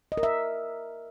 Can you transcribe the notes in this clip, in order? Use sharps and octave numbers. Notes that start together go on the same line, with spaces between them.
D#5
A#4
E5